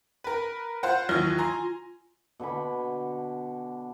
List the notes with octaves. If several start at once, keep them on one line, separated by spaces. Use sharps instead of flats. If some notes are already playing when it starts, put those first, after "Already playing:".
A#4 B4
F4 C5 F#5
D#2 E3 F#3 F4
G#5 A#5 C6
B2 D3 G#5 B5